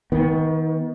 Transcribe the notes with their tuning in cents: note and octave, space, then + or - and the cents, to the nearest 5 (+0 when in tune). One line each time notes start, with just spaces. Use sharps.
D#3 +35 B3 +0